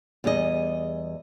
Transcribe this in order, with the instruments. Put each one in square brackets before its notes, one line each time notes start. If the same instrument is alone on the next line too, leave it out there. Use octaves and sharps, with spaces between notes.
[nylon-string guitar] E2 G3 G#4 D#5